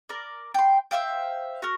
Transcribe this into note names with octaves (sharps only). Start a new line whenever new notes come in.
A#4 D5
G5 C6
C5 E5 F5 G5
F#4 A#4